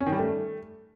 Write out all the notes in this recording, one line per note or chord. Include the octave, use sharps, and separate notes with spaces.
C#4
D#3
G3
A3